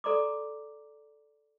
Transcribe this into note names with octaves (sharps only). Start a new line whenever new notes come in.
A4 D5 A#5 C6 D6